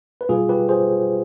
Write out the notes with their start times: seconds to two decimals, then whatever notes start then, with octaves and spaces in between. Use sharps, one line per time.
0.21 B4
0.29 B2 G3 F4 G#4
0.49 G4 B4
0.69 G#4 C5